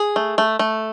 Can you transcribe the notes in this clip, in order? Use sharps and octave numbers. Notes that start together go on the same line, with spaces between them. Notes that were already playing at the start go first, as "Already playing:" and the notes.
Already playing: G#4
A3
A3
A3